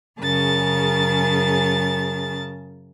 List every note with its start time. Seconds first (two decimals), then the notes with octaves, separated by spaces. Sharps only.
0.21 F#2 C#3 G#4 A#4 A5 A6